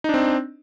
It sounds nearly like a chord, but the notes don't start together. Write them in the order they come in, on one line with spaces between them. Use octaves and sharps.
D#4 D4 C4